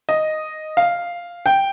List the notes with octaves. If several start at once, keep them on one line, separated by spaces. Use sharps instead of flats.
D#5
F5
G5